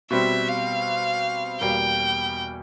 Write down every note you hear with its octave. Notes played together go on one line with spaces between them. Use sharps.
B2 G3 C4 E5
F5
E2 B2 G3 A#3 G5